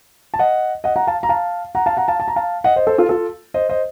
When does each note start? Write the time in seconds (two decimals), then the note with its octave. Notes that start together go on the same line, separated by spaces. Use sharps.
0.34 A5
0.39 D#5 F#5
0.84 D#5 F#5
0.96 F#5 A#5
1.07 F5 A5
1.23 A#5
1.29 F5 A5
1.75 F#5 A#5
1.86 F5 A5
1.97 F#5 A#5
2.08 F5 A5
2.20 A5
2.28 A#5
2.36 F5 A5
2.64 D#5 F#5
2.76 C5 D#5
2.87 A4 C5
2.98 F4 A4
3.09 F4 A4
3.54 C5 D#5
3.69 C5 D#5